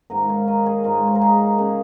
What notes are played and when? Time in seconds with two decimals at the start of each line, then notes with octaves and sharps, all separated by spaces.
0.10 G#2 D#3 A#3 A#4 D#5
0.29 C#5 F5
0.47 A#4 D#5
0.66 G#4 C#5
0.84 G#2 G#3 F4 A#4
1.07 C#5
1.15 A#4
1.21 D#4 G#4
1.58 C#3 A#3